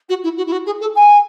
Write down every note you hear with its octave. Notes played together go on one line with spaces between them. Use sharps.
F#4
E4
F#4
E4
F#4
G#4
A4
G#5